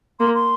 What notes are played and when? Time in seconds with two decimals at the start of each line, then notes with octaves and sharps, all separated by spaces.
0.20 A#3 C6
0.35 C6